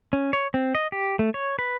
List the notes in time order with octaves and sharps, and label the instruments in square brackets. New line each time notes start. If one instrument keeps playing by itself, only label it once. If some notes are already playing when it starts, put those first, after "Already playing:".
[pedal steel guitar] C#4
C#5
C4
D#5
G4
A3
C#5
B4